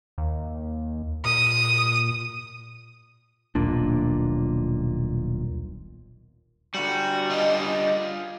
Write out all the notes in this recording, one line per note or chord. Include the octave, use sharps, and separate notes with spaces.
D#2
A#2 D#6
D#1 B1 A#2 D4
D3 G3 F#4
F4 G#4 D#5